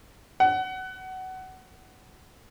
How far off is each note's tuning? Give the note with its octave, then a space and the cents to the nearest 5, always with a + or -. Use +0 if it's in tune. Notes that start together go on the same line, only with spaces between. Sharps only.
F#5 +20